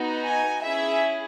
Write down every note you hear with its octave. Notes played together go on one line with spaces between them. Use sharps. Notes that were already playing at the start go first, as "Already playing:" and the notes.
Already playing: B3 D#4 F#4
G#5
C#4 E4 G#4 E5